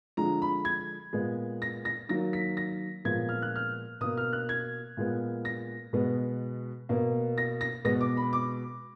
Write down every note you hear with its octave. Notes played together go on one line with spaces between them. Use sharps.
D3 F3 G#3 A#5
B5
G#6
A#2 G#3 B3
A#6
A#6
D#3 F#3 A#3 A#6
B6
A#6
A#2 F3 G#3 B3 G#6
F6
F#6
F6
B2 A#3 D#6
F6
F#6
G#6
A#2 G#3 B3
A#6
B2 G#3 B3
B2 A#3
A#6
A#6
B2 G#3 B3 A#6
D6
B5
D6